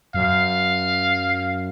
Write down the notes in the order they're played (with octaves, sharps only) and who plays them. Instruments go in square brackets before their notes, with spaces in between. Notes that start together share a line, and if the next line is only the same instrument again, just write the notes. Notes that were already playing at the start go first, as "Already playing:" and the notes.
[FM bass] F#2 [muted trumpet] F5